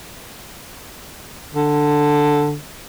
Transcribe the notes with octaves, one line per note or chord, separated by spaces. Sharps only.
D3